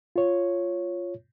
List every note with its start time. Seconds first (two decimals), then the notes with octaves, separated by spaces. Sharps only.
0.16 F4 C#5